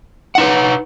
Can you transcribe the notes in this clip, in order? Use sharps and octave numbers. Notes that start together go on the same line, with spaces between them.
D#4 B4 F#5